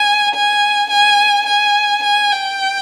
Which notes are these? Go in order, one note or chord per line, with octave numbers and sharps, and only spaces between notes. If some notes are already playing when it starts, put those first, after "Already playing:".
Already playing: G#5
G#5
G#5
G#5
G#5
G5